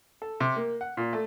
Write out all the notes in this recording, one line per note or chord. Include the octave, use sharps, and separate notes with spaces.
A4
C3
A#3
F#5
A#2
A3